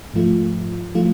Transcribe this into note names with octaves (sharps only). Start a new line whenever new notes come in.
G#2 F3 A3 F4
F3 A3 F4